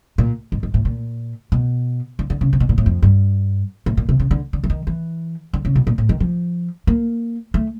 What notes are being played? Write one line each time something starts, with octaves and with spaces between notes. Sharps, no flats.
A#2
G#2
G#2
A2
A#2
B2
D3
D3
C#3
C3
B2
A#2
A2
F2
G2
A2
A#2
C3
C#3
D3
D3
E3
D#3
E3
D3
C#3
B2
A#2
A2
D#3
F3
A#3
A3